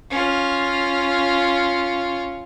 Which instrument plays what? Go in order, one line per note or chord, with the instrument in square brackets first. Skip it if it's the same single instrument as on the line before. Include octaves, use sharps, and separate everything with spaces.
[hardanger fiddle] C#4 F4